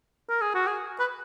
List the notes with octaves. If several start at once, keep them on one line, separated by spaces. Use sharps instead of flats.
A#4
G#4
F#4
G#4
B4